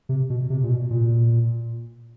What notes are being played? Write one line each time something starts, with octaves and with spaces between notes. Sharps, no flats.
C3
B2
C3
A#2
B2
A#2